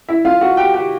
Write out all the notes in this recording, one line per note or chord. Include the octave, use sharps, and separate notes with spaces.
E4 E5
F4 F5
F#4 F#5
G4 G5
G4 G5